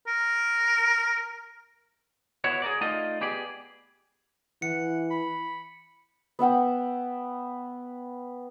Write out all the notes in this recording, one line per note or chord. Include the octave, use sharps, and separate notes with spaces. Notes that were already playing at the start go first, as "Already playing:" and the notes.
A#4
B3 E4 F#4 C#5
G#4 A#4 D5
A3 D#4 F4 D5 D#5
B3 G4 G#4 D5
E3 F#5 C#7
B5
B3 E5 F#5 G5